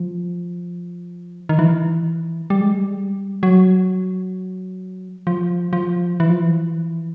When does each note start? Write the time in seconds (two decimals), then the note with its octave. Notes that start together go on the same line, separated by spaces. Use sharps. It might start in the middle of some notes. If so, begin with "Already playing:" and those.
Already playing: F3
1.49 D#3
1.59 E3
2.50 G3
2.61 G#3
2.71 G3
3.43 F#3
5.27 F3
5.73 F3
6.20 E3
6.30 F3
6.40 E3